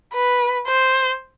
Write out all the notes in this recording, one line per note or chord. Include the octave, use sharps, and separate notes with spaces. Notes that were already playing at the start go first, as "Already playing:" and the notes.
B4
C5